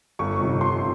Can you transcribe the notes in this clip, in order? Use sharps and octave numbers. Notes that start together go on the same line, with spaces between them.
G1 C#6
F2 C3 D#3
G1 C6